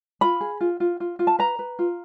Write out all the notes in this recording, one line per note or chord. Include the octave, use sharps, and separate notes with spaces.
F4 B5
G#4
F4
F4
F4
F4
A5
B4 A#5
B4
F4